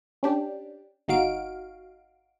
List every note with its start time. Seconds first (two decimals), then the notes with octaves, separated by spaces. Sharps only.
0.23 C#4 D4 G4
1.08 G1 D#4 F#4 F5 D7